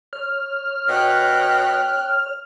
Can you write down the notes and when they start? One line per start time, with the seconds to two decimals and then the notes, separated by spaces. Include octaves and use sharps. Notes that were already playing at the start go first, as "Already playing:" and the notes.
0.13 C#5 F6
0.89 B2 G5 F#6